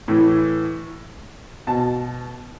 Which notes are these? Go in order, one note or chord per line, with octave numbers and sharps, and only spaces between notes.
A2 E3
B2 A5